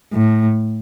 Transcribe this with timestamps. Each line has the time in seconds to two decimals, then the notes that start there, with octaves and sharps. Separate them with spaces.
0.13 A2